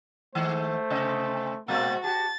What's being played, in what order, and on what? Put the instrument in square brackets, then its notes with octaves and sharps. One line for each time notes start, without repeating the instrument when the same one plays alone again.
[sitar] D#3 G#3 [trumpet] A3 [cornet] C5
[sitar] C3 D#5
[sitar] A#2 G#3 C4 [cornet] A#3 [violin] F#4 A6
[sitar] F#4 G4 [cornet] A5 [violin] A6